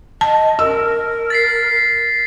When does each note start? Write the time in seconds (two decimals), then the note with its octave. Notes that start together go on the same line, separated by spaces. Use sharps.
0.21 D#5 A5
0.59 A#4 E6
1.30 A6 B6 C7